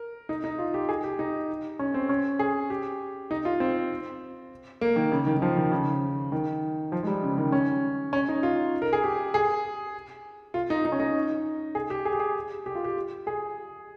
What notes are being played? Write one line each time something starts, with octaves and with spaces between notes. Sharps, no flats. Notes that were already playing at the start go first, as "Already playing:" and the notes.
Already playing: A#4
D#4
D#4
F4
G4
G#4
G4
D#4
C#4
C4
C#4
G#4
G4
D#4
F4
C4
A#3
D#3
C#3
D#3
D#3
F3
D#3
C#3
D#3
F3
G#3
G3
C#3
D#3
C#4
C#4
D#4
F4
A#4
G#4
G4
G#4
F4
D#4
D#4
C#4
D#4
G#4
G4
G#4
G4
G#4
G4
F4
G4
G#4